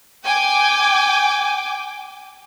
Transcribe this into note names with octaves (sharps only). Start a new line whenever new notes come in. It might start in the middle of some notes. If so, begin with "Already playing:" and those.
G5 G#5 D6